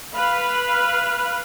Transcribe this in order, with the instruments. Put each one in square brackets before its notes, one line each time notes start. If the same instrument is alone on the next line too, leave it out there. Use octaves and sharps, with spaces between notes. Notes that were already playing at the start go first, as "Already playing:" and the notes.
[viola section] B4 F5 B5